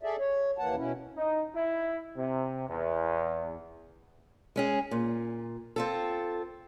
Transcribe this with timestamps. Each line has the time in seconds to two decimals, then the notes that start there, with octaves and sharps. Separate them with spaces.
0.03 G#4 A4 D5 E5
0.19 C#5
0.58 D#2 E3 A#3 F#5 A5
0.76 B2 C#4 E4
1.17 D#4
1.55 E4
2.17 C3
2.68 E2
4.56 G#3 C#4 G#4
4.91 A#2
5.76 C4 F4 A4